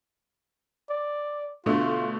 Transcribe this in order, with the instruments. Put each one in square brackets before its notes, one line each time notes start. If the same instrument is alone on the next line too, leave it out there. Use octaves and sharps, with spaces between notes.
[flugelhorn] D5
[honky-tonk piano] B2 D3 A3 [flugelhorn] F4